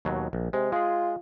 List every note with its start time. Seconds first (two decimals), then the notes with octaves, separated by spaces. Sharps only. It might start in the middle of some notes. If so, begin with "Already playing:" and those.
0.05 D#2 B2 F#3
0.33 A#1
0.53 C3 G#3
0.72 G#3 F4 G#4